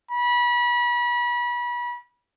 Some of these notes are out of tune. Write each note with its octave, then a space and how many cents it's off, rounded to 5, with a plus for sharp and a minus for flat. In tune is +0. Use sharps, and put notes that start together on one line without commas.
B5 -30